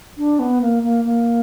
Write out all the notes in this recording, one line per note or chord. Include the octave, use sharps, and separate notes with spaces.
D4
B3
A#3
A#3
A#3